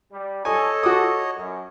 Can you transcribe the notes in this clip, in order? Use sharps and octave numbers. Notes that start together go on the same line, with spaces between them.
G3
A4 C#5 D#5 G#5
F#4 D6 D#6
F#2